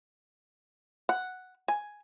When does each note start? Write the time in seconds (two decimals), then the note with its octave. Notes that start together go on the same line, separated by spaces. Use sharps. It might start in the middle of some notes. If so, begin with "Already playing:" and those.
1.09 F#5
1.68 G#5